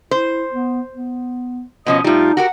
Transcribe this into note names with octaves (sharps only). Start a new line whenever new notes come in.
E4 C5
B3
B3
B2 F3 C#4 D#5 D#6
A2 G3 D#4 F4
F#4 G4 A#4 F#5